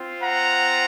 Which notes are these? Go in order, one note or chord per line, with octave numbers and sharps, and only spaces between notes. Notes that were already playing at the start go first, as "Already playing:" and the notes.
Already playing: C4 F4
F#5 A#5